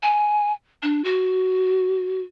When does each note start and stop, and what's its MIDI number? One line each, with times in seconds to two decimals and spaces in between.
0.03 0.52 80
0.83 1.03 62
1.04 2.21 66